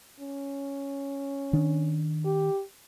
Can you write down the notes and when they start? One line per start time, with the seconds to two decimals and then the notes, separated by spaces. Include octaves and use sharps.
0.20 C#4
1.53 D#3 D4
2.25 G4